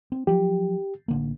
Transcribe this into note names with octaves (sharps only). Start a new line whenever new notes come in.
C4
F3 F#3 G4
A1 D3 A#3